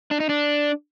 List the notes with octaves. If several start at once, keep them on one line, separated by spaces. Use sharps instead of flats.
D4
D#4
D4